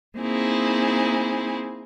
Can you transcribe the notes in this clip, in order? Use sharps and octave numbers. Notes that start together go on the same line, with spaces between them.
A#3 C4 D#4 E4 G#4